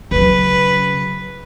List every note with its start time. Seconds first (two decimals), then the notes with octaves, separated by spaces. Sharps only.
0.11 C#3 F#3 B4